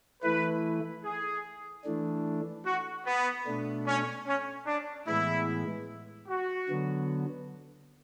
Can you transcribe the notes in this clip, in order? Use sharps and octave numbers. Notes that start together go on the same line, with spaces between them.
E3 A3 E4 B4
G#4
E3 A3 D4
F#4
B3
B2 A3 D4
C#4
C#4
D4
A2 E3 G#3 B3 E4
F#4
D3 F#3 B3